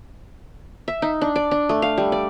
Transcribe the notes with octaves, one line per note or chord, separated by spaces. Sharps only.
E5
D#4
D4
D5
D4
A3
F5
G3
D5